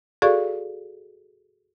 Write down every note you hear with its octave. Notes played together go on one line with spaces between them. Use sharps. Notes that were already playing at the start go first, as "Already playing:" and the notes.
F#4 G#4 A4 D5 F5 C#6